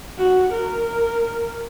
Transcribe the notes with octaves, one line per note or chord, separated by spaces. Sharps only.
F#4
A#4